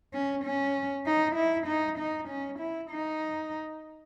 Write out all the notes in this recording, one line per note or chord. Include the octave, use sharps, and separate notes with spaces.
C#4
C#4
D#4
E4
D#4
D#4
C#4
E4
D#4